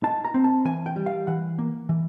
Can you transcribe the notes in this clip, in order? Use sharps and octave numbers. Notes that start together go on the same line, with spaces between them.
D#4 A5
A#5
C4
A5
E3 G#5
G5
G3
F5
E3 F#5
A#3
E3